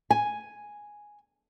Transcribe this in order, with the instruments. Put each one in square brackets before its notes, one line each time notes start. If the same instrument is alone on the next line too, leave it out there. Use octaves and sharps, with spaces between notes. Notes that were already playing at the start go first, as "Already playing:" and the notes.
[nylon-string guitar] G#5